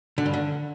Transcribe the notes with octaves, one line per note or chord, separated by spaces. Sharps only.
D3
G2
D3